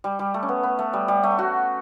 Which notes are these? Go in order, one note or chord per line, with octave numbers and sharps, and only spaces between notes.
G3
G3
A3
C#4
B3
B3
A3
G3
G3
A3
F#4